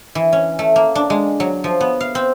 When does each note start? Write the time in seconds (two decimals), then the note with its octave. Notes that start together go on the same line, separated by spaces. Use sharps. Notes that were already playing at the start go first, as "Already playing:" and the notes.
0.15 E3
0.33 C#4
0.59 A3
0.76 A#3
0.95 D4
1.10 G#3
1.40 F#3
1.64 F3
1.81 B3
2.01 F5
2.15 C4